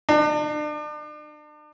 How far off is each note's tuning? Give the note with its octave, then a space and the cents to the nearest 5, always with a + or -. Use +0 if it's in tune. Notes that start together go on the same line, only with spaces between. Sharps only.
D4 +40